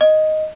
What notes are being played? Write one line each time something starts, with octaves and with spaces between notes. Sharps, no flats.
D#5